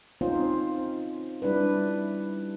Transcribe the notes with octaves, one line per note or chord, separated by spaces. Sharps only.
C4 C#4 D#4 F4 C5
G3 D4 E4 B4